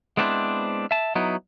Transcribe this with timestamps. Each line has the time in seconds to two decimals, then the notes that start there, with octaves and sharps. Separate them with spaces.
0.17 G#3 B3 C4 D4 E4 C5
0.91 E5 A5
1.15 F#3 B3 D#4 E4